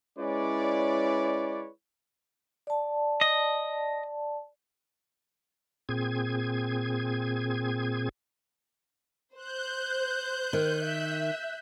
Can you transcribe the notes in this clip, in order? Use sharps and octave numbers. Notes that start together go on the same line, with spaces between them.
G#3 C#4 E4 B4 C#5 D5
D5 A5
D#5
A#2 C4 G#4 G#6
C5 F#6 G6
D#3
E5